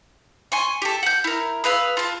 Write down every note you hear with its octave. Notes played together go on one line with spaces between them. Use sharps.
G#5 C6 C#6
G4 A4
F#5 G6
E4 A#4
G#4 B4 F5 E6
F4 A5